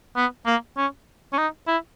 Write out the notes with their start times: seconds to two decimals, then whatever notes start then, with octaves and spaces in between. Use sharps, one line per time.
0.17 B3
0.47 A#3
0.77 C#4
1.33 C#4
1.38 D#4
1.67 E4